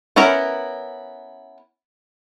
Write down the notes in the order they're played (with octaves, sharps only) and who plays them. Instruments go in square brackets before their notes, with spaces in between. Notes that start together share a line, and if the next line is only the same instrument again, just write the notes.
[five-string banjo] B3 C#4 E4 A#4